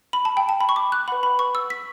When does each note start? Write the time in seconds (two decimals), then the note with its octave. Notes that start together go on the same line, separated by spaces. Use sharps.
0.13 B5
0.25 A5
0.37 G5
0.49 A5
0.61 B5
0.69 C#6
0.76 D6
0.92 F#6
1.08 B4 F#5 B5
1.23 B5
1.39 C#6
1.55 E6
1.70 B6